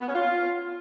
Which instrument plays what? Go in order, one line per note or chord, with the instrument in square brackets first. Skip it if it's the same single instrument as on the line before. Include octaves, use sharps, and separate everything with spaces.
[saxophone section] B3
C#4
F4